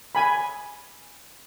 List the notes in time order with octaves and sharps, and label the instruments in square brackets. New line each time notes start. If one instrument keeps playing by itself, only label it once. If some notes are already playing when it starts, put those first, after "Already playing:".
[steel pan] G#5 B5